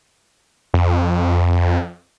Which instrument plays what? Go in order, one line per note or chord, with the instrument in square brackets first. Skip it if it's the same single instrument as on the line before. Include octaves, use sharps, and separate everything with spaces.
[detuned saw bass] F2